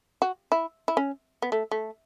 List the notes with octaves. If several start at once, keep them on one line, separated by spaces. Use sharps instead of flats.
F#4
E4
E4
C#4
B3
A3
A3